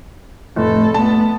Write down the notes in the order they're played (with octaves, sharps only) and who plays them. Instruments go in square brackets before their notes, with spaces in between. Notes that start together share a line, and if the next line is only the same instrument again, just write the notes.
[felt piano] F1 [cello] A2 A4
[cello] A3 B3 [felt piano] A5